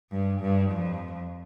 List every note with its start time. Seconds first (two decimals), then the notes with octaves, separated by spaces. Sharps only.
0.11 G2
0.41 G2
0.71 F2